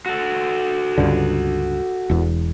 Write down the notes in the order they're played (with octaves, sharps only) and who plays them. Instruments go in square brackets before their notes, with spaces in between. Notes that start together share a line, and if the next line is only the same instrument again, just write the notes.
[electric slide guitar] F#4 A4
[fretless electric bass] C#2 G2 D3
E1 E2